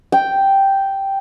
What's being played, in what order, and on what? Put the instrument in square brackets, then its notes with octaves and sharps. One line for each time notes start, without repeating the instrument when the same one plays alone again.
[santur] G5